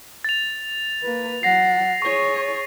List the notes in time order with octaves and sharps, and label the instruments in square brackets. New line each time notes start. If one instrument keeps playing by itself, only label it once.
[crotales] A6 F7
[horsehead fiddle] A#3 B4
[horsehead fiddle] F#3 F#5 [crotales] A#6 C7
[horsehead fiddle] G#4 C#5 [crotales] C#6